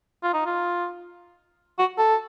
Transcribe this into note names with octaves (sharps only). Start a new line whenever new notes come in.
F4
D#4
F4
F#4
A4